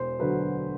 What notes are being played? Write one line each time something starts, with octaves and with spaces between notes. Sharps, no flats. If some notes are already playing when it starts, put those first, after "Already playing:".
Already playing: E1 C5
D2 D3 F#3 B4